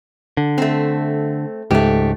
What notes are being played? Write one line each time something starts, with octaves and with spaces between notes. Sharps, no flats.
D3
A3 C4
C#2 G#2 A3 G4